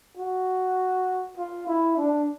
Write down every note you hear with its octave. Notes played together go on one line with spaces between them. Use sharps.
F#4
F4
E4
D4